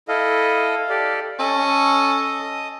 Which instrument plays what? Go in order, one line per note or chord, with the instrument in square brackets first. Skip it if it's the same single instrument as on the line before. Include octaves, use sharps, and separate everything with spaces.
[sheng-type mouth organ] E4 A4 D#5 [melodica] F5
[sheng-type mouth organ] G4 A4 D5
[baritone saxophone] C#4 [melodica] A4 [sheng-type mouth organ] D#5 D#6